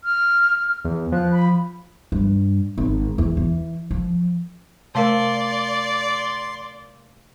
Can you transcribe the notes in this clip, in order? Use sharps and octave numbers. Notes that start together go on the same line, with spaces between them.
F6
E2
F3 F#6
B5
G2
G#1
E2
E3
F3
C3 A3 A#4 D5 F5 A5 C6